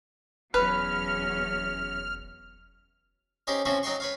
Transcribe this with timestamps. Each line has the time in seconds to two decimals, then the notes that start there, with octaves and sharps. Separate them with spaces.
0.54 F1 E2 F#3 C#4 B4 F6
3.47 C#4 D#4 G4 C5
3.65 F3 C4 C#4 E4 F#4
3.83 F#3 D#4 G5 C6 C#6
4.00 B4 C#5 F5